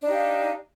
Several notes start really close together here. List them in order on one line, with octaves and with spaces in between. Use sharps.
D4 D#4 G4 F5